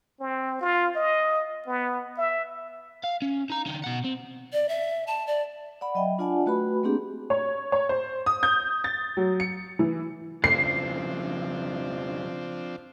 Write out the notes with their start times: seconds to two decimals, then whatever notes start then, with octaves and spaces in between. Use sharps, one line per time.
0.20 C4
0.61 F4
0.96 D#5
1.67 B3
2.18 E5
3.04 F5
3.22 C#4
3.50 D#4 A#5
3.66 D3 D#4
3.84 B2 F#5
4.04 C4
4.53 D5
4.69 E5
5.07 A5
5.27 D5
5.81 D5 F#5 B5
5.95 F#3 D#5 E5 G5
6.19 D4 F4 D5 F#5 G#5 A5
6.46 A3 F#4 B4 B5
6.83 A3 A#3 C4 D4 G4 G#4
7.30 C#5
7.72 C#5
7.89 C5
8.26 D#6
8.43 G6
8.84 A6
9.17 F#3
9.40 C#7
9.79 E3
10.44 F2 C#3 F3 C4 D4 C7